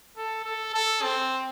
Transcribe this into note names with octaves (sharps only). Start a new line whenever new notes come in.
A4
A4
A4
C4